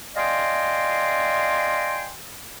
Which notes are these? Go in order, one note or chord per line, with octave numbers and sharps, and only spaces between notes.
D5 D#5 F5 G5 G#5 C6